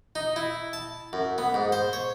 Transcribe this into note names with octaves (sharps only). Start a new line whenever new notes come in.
D#4
E4
A5
F#2
B3
G#2
C5
C#5